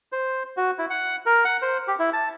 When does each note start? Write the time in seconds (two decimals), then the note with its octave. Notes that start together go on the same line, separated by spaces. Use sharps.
0.12 C5
0.57 F#4
0.78 E4
0.90 F#5
1.26 A#4
1.45 F#5
1.62 C5
1.88 G4
1.99 E4
2.13 A5